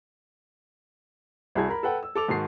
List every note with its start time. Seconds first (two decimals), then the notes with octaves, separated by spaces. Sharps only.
1.55 C2 E4 F#4 G#4 A5 G#6
1.68 A#4 B5
1.83 A4 B4 F#5 G5
2.03 E6
2.15 A4 D6 F7
2.28 G#2 D#3 F#4 A5 C7